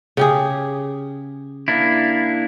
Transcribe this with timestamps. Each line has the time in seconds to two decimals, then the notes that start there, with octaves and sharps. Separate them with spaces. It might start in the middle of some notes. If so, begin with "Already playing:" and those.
0.17 C#3 G4 G#4
1.68 A#3 D4 E4